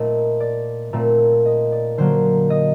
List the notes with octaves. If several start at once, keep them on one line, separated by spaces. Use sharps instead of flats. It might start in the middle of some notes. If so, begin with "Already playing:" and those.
Already playing: A#2 A3 C4 D#5
D5
A#2 A3 C4
D#5
D5
D3 F#3 A#3 C5
D#5